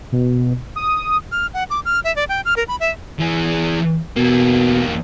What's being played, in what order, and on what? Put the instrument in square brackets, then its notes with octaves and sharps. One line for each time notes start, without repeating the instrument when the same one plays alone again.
[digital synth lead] B2
D#6
[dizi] F6
F#5
D6
F6
E5
D5
G5
F6
A#4
B5
E5
[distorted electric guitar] E3 G#4
[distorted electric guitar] E2 A#3 [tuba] B2